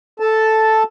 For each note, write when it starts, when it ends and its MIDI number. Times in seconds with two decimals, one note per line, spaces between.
0.20 0.83 69
0.20 0.83 81